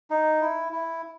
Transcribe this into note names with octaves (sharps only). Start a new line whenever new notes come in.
D#4
E4
E4